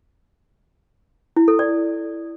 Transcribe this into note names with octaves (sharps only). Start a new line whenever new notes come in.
E4
A4
D5